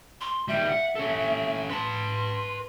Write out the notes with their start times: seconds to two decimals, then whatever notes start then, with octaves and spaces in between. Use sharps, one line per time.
0.21 C6
0.48 D#3 G3 E5
0.69 F#5
0.95 C#4 A4
1.69 B4 A5 C6